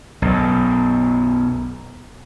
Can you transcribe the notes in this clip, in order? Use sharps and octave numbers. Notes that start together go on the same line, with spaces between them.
B1 F#2